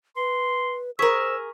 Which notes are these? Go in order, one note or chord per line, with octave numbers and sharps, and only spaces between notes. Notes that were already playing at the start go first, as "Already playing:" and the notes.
B4 C6
G#4 A#4 C5 C#6 E6 B6